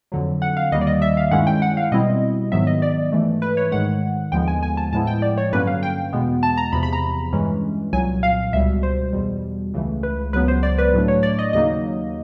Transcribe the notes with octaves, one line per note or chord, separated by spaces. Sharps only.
F2 D3 F#3
F#5
F5
D#2 D#3 G3 A#3 D#5
D5
D#5
E5
F5
G2 D#3 G#3 C#4 E4 F#5
G5
F#5
F5
B2 G3 C4 E4 D#5
G#2 D#3 F#3 B3 E5
D#5
D5
G#2 E3 A3
B4
C#5
G#2 D#3 G#3 F#5
D#2 D3 F3 G#3 B3 G5
G#5
G#5
A5
A2 F3 G#3 B3 E4 A5
G5
D5
C#5
G2 D3 F#3 A#3 C#4 B4
F5
G5
E2 B2 G#3 B3
A5
A#5
E2 C3 F3 B5
B5
A#5
G2 E3 G#3 C#4
C2 A#2 F#3 G#5
F5
C#2 B2 G3 E5
C5
E2 B2 G3
C#2 C#3 E3 A3
B4
C#2 C#3 F#3 B3 B4
C5
D5
B4
A2 F#3 A3 D4
C#5
D5
D#5
D#2 C#3 F#3 A#3 D#4 D#5